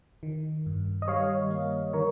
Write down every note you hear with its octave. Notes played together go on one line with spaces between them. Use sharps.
D#3
G2
D#5
G3 C#5 F5
A#3
D#3 A#4 C#5